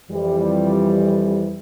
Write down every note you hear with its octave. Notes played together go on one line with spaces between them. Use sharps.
F2 E3 G3